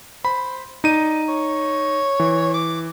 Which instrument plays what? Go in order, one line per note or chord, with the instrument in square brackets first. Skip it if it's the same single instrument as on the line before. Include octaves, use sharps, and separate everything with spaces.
[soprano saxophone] C5 [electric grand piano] B5
[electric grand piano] D#4 D#7 [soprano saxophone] D5
[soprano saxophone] C#5
[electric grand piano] E3
[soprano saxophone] D6